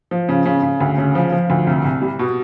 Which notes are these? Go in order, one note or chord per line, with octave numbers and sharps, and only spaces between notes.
F3
C#3
C#3
C#3
D2
C#3
F3
F3
D2
C2
C2
G3
B2